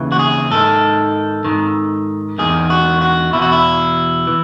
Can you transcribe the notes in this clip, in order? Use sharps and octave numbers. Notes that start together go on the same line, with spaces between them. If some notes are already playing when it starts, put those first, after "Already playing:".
Already playing: D#2 C#3 E3
F#4
G#4
G#2 D#3 A4
G#2 D#3
E2 D#3 G#4
F#4
F#4
E2 B2 E4
F#4
E4
E3